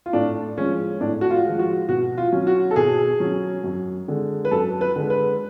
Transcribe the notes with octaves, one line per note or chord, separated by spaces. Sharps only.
F4
A2 D4
F3 G#3 C#4
A2 D4
F#4
F4
F3 G#3
F#4
B2 F#4
F4
F#3 C#4
F#4
A4
B2 G#4
F#3 C#4
F#2
D3 G#3
B4
F#2 A4
B4
D3 G#3
B4